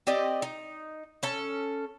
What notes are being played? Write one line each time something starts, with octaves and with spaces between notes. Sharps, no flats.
C4 G4 D5 D#5
D#4
C#4 A4